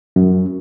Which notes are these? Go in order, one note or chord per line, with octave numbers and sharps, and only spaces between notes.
F#2